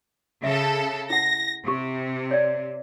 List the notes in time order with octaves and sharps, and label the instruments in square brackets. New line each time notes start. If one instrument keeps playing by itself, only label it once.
[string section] C#3 A4 [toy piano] E5
[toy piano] E4 F#5 [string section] A#6
[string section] C3 [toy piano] G4
[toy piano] C#5 D5